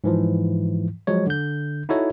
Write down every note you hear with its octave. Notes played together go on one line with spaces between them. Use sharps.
G#2 E3 F3
F3 F#3 G#3 C#5
D3 G6
D#4 E4 F#4 A4 C#5